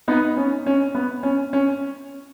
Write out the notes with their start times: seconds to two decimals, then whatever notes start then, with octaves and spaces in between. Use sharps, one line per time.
0.08 B3 D#4
0.37 C#4
0.66 C#4
0.95 B3
1.23 C#4
1.53 C#4